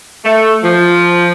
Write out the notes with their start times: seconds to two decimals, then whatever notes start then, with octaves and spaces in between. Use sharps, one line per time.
0.24 A3
0.63 F3